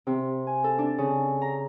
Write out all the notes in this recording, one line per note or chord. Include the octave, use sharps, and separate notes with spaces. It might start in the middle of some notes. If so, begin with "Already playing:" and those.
C3
G#5
A4
D4
C#3
A#5